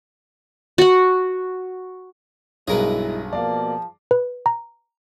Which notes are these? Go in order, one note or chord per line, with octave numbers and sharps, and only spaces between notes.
F#4 F#5
B1 G2 B2 G#3 E4 G#4 A#4 B4
B2 F3 A#3 D5 F5 A5
B4
A#5